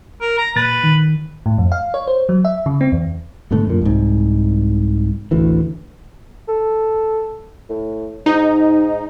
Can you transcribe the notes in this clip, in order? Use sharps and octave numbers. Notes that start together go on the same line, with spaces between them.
A#4
A#5
A#2 B4 A6
D#3
A2
F2
F5
C#5
C5
F#3
E5
C#3
C4
E2
G#2 B2 D3 A3
F#2 A#2
C2 G#2
A1 D2 E3
A4
A2
G#2 D#4